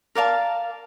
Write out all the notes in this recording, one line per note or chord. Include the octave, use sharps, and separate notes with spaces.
A#4 D5 F5 A5